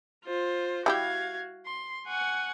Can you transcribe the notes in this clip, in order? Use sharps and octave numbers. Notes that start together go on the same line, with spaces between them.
F4 C5
G3 E4 F#4 G4 F5 G#6
C6
F#5 G#5 C#6